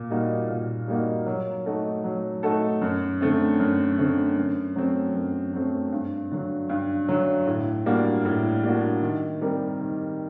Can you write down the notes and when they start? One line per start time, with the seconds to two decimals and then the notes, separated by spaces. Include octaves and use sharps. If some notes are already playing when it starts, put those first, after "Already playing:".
Already playing: A#2
0.10 G3 A#3 D#4 F#4
0.50 A#2
0.88 G3 A#3 D#4 F#4
1.26 F#3
1.66 A3 D#4 F#4 A4
2.04 F#3
2.43 A3 D#4 F#4 A4
2.81 F#2
3.21 D3 A3 C4
3.60 F#2
3.98 D3 A3 C4
4.37 F#2
4.76 F#3 A3 C4
5.14 F#2
5.53 F#3 A3 C4
5.92 G2
6.31 D3 F#3
6.69 G2
7.08 D3 F#3
7.47 A2
7.86 G3 A#3 D4 F#4
8.25 A2
8.64 G3 A#3 D4 F#4
9.02 D#3
9.41 G3 C4 G4 A#4
9.80 D#3